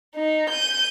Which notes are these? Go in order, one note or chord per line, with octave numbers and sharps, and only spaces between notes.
D#4
G6 D#7